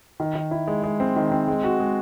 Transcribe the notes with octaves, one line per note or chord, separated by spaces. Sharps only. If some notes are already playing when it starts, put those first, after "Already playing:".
D#3
D#3
E4
G#3
G#3
C4
D#3
C4
G#3
F#4
G#3